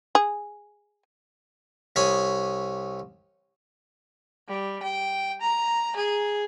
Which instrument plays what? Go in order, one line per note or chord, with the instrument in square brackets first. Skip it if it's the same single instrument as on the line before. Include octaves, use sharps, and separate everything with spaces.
[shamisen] G#4
[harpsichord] C2 C#5 G#5 B5 D#6
[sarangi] G3
G5
A#5
G#4